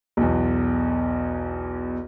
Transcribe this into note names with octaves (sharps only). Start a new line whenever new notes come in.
B1 E2